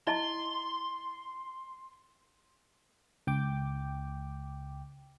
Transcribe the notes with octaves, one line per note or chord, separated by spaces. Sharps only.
E4 D#5 A5 C6
C#2 G5 D6